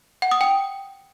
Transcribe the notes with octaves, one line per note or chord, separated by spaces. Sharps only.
F#5
D#6
G5